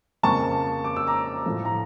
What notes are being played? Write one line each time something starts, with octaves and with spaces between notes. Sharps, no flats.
F2 C#3 F3 A#3 A5 C#6
D6
E6
A#5 D6
A2 F3 A3
A#5